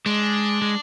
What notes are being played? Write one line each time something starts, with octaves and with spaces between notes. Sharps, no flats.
G#3 D4
G#3